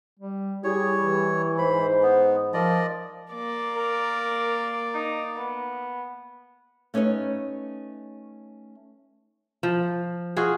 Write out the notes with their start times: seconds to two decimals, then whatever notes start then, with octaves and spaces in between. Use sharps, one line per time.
0.19 G3
0.64 G3 E4 G#4 C#5
1.00 E3
1.58 G#2 C5 B5
2.03 B3
2.54 F3 A#4 D5 D#5
3.32 A#3 D5
3.75 A#4
4.94 D#4
5.36 B3
6.94 A3 C#4 D#4 B4 C#5
9.63 F3
10.37 F4 F#4 G#4